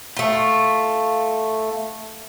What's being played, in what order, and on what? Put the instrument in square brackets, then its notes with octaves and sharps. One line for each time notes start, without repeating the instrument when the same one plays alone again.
[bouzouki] A3 F4